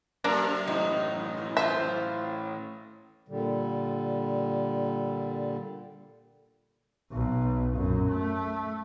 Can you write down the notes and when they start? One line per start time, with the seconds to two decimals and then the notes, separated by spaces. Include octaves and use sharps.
0.24 F#2 C3 A#3 D4 A#4
0.68 A2 E3 D#4
1.57 F4 C5 E5
3.28 A#2 D3 G3
7.12 B1
7.77 F#2 A#2
8.08 A3